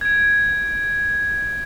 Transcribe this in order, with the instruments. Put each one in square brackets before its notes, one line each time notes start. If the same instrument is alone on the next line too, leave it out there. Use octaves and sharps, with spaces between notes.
[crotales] G#6 D7